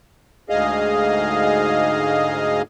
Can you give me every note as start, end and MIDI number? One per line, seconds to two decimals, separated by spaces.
0.49 2.62 38
0.49 2.62 44
0.49 2.62 68
0.49 2.62 75
0.49 2.62 77